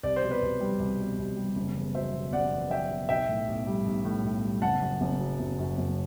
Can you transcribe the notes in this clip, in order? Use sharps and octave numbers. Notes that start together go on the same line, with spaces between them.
C2 D5
C5
B2
B4 D5
C2
G3
C2
B2
C2
G3
F#1
E2
F#3 C5 E5
B2
F#1 D5 F#5
E2
F#3 E5 G5
B2
B1 E5 G5
A2
B1
G3
B1
A2
B1
G3
F#1 F#5 A5
F#2
F#1
F#3
F#1
F#2
F#1